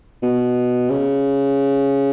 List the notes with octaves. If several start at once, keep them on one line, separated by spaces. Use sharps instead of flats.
B2
C#3